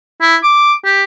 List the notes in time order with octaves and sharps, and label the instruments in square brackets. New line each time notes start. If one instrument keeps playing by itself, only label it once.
[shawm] E4
D6
G4